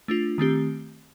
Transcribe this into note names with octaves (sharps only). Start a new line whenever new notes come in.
A3 D4 F4
D#3 A3 C4 G4